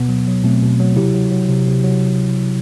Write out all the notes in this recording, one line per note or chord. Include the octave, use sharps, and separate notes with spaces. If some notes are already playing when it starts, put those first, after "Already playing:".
Already playing: B2 B3
F#3
F#3
B2 A3 C4
B2
F#3
C3 E4 G4
F#3
F#3
C3
C3
F#3